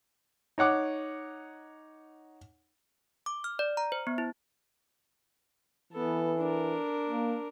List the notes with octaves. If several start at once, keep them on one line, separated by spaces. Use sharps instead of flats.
D#4 C#5 F#5 D6
D6
F6
D5
A#5
C5
B3
E4
E3 B3 A4
D4 A#4
A#3